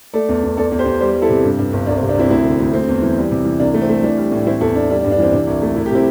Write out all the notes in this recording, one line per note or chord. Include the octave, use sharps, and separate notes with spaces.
A3 A4 D5
E2
E2
E2 A4 D5
E2
G4 C5
E2
G3 G4 C5
G3
E4 A4
C3
G2
G2
G1
C2 D4
C4
C3
D4
C2 C4 E4
D2 C4 E4
D3
D2
A3 C4
E2
E3
G3
C3
E3
C2 D4
A3
C4
A3
E3 D4
G3
A2
E3 C4 E4
E2 E4 A4
E2 D4
G3 D4
D4
G2
D4
E3 C4
C3 D4
C2
A3
C2 E4
G4
C3 C4 E4